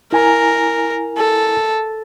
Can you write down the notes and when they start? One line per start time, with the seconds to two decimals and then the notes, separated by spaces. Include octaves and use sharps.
0.12 E4 A#4 G#5 A#5
1.17 A4